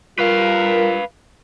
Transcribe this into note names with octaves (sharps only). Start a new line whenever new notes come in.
G3 F4 A#4 B4 F5